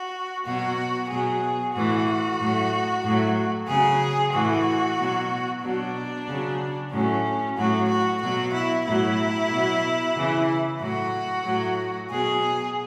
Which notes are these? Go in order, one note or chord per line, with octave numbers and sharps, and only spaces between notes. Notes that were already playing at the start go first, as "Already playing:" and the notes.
Already playing: F#4
B2 F#3 F#4
B2 F#3 G#4
A2 E3 F#4
A2 F#3
A2 F#3
C#3 F#3 G#4
A2 E3 F#4
B2 F#3
B2 F#3 D4
C#3 F#3
A2 F#3 C#4
A2 F#3 F#4
F#4
B2 F#3 F#4
E4
A2 F#3 E4
B2 F#3
C#3 E3
A2 F#3 F#4
A2 F#3
B2 F#3 G#4